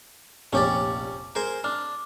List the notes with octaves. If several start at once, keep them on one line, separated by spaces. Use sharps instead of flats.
F1 A#1 C#4 G4 C#5 D5
G#4 A#4 C5 G#5
D4 F6